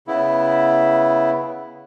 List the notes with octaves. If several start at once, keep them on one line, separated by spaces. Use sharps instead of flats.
C#3 B3 E4